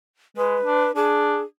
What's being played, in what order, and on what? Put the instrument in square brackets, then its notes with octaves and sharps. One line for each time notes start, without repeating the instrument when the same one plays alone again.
[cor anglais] G#3 [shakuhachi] B4
[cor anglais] D4
[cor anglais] D4 [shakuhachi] G#4